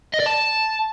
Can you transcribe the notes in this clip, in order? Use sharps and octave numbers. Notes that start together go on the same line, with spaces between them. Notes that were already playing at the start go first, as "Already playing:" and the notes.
D#5
D5
A5